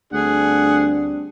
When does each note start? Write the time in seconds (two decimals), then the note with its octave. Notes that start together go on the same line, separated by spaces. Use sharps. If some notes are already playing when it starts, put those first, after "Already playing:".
0.13 D2 G3 C4 D4 G#4 F#5